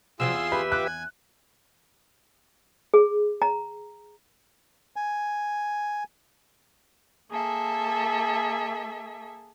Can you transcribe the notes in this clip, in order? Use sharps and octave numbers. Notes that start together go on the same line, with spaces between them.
C3 F3 F#3 F4 G#4 C6 E6
E2
G4 B4 E5 B5
F4 D6 F#6
G#5
G#4
A#5
G#5
A#3 G#4 A4 E5